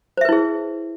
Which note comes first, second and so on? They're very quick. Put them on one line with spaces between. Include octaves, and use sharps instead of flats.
C5 E5 B4 E4 G#4